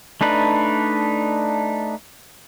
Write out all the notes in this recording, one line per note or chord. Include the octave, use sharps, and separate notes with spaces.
A3 D4 D#4 B4